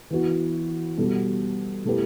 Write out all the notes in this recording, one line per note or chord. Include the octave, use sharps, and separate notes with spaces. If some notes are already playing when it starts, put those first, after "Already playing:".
E3 B3 F#4
B2 G3 B3 F#4 A4
B2 A3 E4 G4 B4